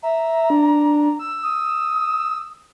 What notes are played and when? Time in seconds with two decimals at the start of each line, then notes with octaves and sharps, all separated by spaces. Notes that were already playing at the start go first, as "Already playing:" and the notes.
0.03 E5 A#5
0.50 D4
1.19 E6
1.43 D#6